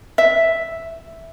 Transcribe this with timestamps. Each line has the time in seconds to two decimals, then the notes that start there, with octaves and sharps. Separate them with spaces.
0.18 E5